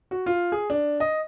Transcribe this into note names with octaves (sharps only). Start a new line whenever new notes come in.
F#4
F4
G#4
D4
D#5